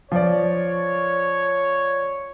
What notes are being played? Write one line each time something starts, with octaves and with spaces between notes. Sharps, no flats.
F3 C#5 D5